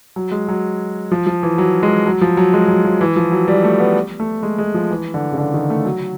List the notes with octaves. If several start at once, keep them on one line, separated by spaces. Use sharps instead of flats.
F#3
G#3
F#3
F3
F3
E3
F#3
G#3
F#3
F3
F#3
G#3
F#3
F3
E3
F3
F#3
G3
A3
B3
A3
G#3
G#3
F3
E3
D3
C#3
D3
D#3
A3
F#3